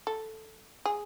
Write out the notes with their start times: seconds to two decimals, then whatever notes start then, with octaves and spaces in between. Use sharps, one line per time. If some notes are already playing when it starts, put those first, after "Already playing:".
0.07 A4
0.85 G#4